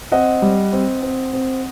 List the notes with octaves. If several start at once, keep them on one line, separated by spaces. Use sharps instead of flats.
C4 D#5 F#5
G3
C4
C4
C4